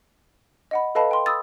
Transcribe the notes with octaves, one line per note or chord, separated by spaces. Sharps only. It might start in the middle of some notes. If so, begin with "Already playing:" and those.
D#5 F#5 B5
A4 B4 D#5 F5 A5 B5
G5 C6
B5 D#6 E6 A6